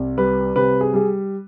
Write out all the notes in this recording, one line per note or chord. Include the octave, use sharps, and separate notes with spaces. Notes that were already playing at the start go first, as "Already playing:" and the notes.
Already playing: C2
G3 B4
C3 B4
G#4
G3 G#4